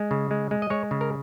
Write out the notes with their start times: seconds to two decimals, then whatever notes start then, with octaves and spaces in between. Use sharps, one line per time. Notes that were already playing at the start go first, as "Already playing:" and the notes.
Already playing: G#3
0.11 C#3
0.31 G#3
0.51 G#3
0.62 D#5
0.70 G#3 C#5
0.91 C#3
1.01 A#4